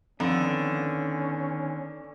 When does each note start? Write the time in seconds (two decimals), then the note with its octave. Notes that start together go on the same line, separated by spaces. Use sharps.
0.20 F2 D3 D#3 B3 C#4